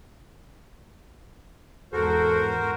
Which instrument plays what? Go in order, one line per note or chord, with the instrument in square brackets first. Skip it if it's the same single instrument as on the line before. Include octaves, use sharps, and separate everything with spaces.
[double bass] E2 G#2 [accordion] F#4 A#4 C5 [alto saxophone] A4